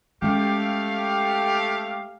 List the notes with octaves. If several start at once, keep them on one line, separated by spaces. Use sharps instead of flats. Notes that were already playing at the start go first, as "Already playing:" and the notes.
G#3 A3 C#4 G4 F5